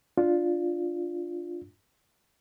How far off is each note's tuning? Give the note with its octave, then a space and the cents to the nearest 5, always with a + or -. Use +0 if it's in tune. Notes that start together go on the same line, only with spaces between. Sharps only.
D4 +5 F4 +0